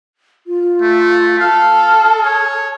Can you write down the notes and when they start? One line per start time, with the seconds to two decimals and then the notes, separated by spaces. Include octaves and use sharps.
0.47 F4
0.82 A3
1.40 A4 F5 F6
2.25 C#5